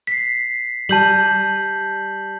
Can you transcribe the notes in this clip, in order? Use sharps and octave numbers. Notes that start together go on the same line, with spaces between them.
B6 C7
G3 A5 G6 F#7